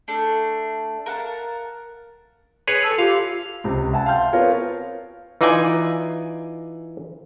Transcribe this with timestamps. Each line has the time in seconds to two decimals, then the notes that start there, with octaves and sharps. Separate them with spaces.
0.08 A3 D4
1.06 A#4 F5 F#5 A5
2.68 G#4 B4 C#5
2.83 A4
2.98 F4 G4 F5
3.64 C#2 C3
3.93 E5 F#5 G#5 A5
4.06 F5 G5 A5 C6 F6 G6
4.33 B3 C4 F4 A#4 C#5 F5
5.41 E3 D#4 F4 D5 D#5 G#5